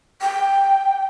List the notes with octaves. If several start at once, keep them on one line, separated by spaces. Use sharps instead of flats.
G5